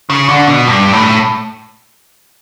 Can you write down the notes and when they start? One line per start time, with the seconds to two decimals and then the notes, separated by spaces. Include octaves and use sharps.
0.10 C#3
0.29 D3
0.47 B2
0.67 G2
0.93 A2